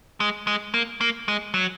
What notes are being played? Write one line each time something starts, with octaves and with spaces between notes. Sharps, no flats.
G#3
G#3
A#3
A#3
G#3
F#3